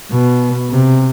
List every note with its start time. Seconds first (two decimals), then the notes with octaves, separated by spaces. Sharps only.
0.11 B2
0.71 C3